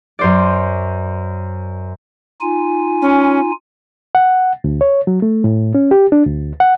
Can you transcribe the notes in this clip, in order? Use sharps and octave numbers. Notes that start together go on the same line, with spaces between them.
F#2 C5 D5
D#4 F4 G#5
C#4
F#5
D2
C#5
F#3
A3
A2
C#4
G4
D4
D2
F#5